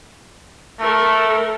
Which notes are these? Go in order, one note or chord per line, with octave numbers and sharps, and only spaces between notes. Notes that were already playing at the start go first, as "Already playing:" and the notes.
A3 A4 A#4